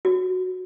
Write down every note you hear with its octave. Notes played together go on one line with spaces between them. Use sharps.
F#4